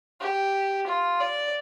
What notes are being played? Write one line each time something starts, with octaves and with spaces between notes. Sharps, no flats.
G4
F4
D5